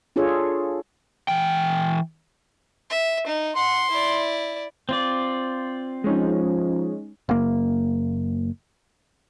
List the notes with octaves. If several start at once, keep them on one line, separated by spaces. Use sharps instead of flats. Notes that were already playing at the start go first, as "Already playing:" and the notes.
D4 F4 G#4 A4 C#5
E3 G5
E5
D#4
F#5 C6
E4 D5
C4 F4 D5
F3 G#3 C#4 D#4
F#1 A#3